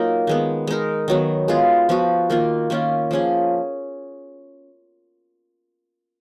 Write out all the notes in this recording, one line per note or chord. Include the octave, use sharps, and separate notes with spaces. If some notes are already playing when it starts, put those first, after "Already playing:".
Already playing: F#3 A#3 D#4 F4 A#4
D#3 G#3 B3
G#3 D#4 A#4
D#3 F#3 B3
G#3 B3 F4 G#4
F3 B3 F#4
D#3 A#3 F4
D#3 A#3 C#4 F4
F3 A#3 C#4 G#4